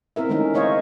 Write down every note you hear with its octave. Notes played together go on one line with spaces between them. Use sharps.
C4 E4 A#4 E5
D#3 G#3 A3 C#4 D#4 A#4
A#4 C5 C#5 D#5 F5